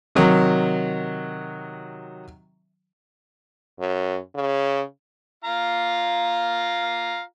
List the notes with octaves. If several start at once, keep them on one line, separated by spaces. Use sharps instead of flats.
C3 D#3 F#3
F#2
C#3
F4 F5 A#5